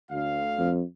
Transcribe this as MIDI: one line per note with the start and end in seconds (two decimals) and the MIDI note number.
0.10 0.71 38
0.10 0.71 77
0.58 0.82 41